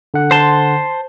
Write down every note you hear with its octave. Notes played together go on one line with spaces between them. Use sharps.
D3 F#5
C5 A5 C6